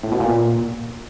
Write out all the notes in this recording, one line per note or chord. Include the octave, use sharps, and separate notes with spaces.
A2
B2
A#2